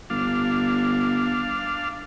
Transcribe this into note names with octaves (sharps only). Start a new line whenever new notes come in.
G1 D4 F5